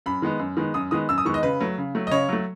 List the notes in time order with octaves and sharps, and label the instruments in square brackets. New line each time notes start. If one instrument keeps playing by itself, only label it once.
[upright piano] F#2 B5
D#3 G#3 B3
F#2
D#3 G#3 B3
F#2 D#6
D#3 G#3 B3 D#6
F#2 E6
D#6
D#3 G#3 B3 C#6
D#5
C#3 B4
F#3 A3
C#3
F#3 A3
D#5
C#3 C#5
F#3 A3